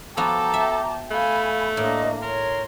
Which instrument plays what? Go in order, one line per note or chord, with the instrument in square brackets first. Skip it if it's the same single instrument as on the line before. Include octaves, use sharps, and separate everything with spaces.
[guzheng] F3 B3 F#4 [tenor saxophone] A4 [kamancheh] G5 A5 [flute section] A#5 D6
[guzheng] E5
[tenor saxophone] A3 [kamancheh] F5 G#5 [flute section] B5
[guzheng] A2 [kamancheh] A#3 D4 [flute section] D#5
[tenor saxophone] A#4 [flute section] C#5 [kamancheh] C6